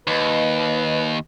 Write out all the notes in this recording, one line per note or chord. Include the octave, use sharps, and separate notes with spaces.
D#2 B4 D#5